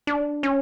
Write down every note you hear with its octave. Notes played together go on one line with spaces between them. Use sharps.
D4
C#4